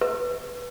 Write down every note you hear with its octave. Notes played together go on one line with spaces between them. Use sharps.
B4